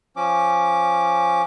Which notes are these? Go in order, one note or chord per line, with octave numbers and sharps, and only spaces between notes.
F3 C#4 D6